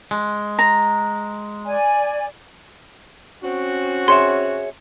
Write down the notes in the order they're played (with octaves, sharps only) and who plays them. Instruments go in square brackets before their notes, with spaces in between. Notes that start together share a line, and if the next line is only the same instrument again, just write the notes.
[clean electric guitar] G#3
[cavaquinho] A#5
[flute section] D5 G#5
[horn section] C4 C#4 F#4
[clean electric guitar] G#4 C#5 E5 [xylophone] C6